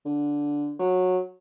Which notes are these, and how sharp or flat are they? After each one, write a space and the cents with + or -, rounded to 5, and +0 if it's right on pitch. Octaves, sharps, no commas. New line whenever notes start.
D3 -10
F#3 -15